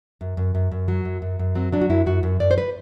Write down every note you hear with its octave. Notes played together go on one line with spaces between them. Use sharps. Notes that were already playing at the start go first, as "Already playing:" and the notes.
F#2
F#2
F#2
F#2
F#3
F#2
F#2
F#2
F#3 C4
F#3 D4
F#4
F#2 E4
F#2 F#4
F#2
F#2 D5
C5
B4